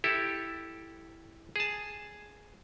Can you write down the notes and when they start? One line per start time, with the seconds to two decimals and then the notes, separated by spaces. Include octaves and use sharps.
0.04 E4 G4 A4
1.56 G#4 A5